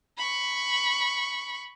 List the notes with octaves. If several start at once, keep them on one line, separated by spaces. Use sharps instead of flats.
B5 C#6